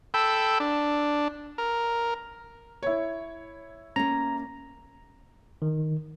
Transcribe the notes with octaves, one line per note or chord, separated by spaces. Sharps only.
A4 G5 B5 E6
D4
A#4
E4 C#5
A#3 C#4 A#5
D#3